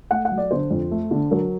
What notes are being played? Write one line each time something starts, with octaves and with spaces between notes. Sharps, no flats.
A3 F#5
F#5
F#3
D5
D3 C5
F2
A3
D3
F#3 A#4